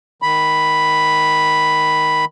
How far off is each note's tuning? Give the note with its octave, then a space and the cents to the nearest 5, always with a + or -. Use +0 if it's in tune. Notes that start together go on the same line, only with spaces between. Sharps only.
D#3 +0 B5 +0